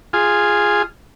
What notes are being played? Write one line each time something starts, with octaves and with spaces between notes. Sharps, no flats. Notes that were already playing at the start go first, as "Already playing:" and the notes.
F4 G#4